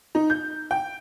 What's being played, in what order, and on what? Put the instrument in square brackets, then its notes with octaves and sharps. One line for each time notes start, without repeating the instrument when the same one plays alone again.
[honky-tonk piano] D#4
G6
G5